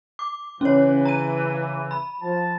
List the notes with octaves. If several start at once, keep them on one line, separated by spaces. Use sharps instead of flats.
D6
C#3 E3 C#4 C#5
A#5 D#7
B5
F3 A5